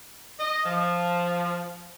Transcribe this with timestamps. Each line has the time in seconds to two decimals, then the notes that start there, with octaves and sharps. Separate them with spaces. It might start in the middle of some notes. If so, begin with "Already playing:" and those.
0.39 D#5
0.65 F3